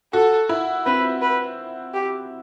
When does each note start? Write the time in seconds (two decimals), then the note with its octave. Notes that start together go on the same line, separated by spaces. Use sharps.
0.13 F#4 A4
0.49 E4
0.86 C4 B4
1.22 B4
1.94 G4